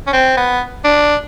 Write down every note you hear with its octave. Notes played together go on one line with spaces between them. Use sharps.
C#4
C4
B3
D4